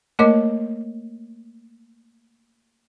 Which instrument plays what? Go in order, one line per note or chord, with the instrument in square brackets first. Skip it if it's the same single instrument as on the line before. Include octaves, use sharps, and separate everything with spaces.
[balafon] A3 A#3 A#4 C#5 D#5 D6